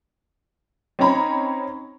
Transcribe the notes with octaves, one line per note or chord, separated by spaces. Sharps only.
C4 C#4 D#4 C#5 A#5 B5